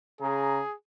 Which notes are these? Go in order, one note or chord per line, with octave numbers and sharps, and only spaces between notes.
C#3 G#4 A#5